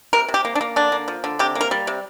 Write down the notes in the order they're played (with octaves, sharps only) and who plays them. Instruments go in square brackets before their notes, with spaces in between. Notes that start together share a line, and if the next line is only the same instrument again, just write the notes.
[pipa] C3 A#4
C3
G4
A#3
D4
A#3
D3 D4
A#3
F3
D3
C3 G4
A#3
A#4
G3
C3